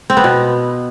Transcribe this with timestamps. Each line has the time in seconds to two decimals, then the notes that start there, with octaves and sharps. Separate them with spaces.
0.10 C4
0.17 B3
0.24 B2